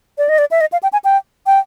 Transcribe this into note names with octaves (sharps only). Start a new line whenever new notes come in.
D5
D#5
D5
E5
D#5
F5
G5
G#5
G5
G5